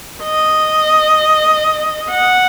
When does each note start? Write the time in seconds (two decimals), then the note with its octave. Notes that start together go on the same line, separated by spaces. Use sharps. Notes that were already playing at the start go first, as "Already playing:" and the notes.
0.23 D#5
2.11 F#5